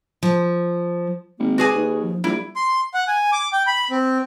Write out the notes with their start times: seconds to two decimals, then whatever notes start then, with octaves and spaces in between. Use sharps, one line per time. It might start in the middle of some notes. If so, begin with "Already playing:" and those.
0.23 F3
1.39 G#1 A#3
1.58 F#4 G#4 B4 G#5
1.75 D#2 B4
2.02 F3
2.24 A#1 G3 E4
2.56 C6
2.94 F#5
3.08 G#5
3.32 D6
3.53 G5
3.67 B5
3.91 C4